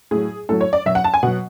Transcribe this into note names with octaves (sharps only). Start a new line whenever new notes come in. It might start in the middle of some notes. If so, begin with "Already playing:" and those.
A2 F#3 G#4
A2 F#3 A4
C#5
D5
B2 F#3 E5
F#5
A5
G#5
B2 F#3 F#5